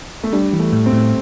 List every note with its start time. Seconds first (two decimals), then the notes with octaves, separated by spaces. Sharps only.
0.24 A3
0.33 G3 D4
0.53 E3
0.59 A3
0.73 A2
0.86 C4
0.93 A2